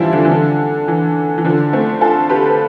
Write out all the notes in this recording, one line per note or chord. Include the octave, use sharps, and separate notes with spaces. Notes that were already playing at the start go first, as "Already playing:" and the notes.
Already playing: E3 F3 G3 C4 D4 E4 F4
D3 F3
E3
D3
E3
E3
D3 F3
A3 C4
F4 A4
G4 B4